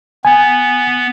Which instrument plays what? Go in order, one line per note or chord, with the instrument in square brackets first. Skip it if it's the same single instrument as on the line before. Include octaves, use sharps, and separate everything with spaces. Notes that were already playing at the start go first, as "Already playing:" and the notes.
[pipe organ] B3 [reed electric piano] G#5